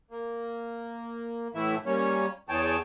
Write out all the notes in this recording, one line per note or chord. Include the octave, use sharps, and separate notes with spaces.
A#3
A2 E3 A3 E4 E5
G3 A#3 C#4 C#5
E2 E3 G#4 C#5 G5 A5